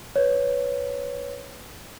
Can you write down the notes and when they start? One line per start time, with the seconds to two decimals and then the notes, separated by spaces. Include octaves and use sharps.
0.16 B4 C#5